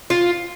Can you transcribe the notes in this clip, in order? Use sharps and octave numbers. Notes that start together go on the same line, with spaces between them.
F4